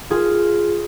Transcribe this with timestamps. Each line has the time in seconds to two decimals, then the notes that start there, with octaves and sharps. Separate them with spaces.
0.10 F4 G#4